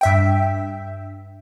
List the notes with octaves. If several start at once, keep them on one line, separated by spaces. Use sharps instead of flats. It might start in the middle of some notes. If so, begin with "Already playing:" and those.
G2 E5 G5